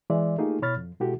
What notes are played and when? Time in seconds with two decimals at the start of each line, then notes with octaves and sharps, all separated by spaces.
0.10 E3 G#3 D5 E5
0.38 A3 A#3 D#4 F4 G4 G#4
0.62 B2 E4 C#5 B5 F6 A6
0.76 F2
1.00 B2 G#3 E4 F#4 G4 A4